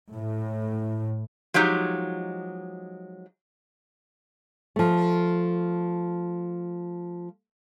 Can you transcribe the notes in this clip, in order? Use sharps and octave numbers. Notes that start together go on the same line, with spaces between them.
A2
F3 F#3 G#3 D#4 G4
F3 A3